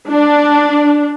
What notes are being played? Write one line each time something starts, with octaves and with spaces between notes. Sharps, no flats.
D4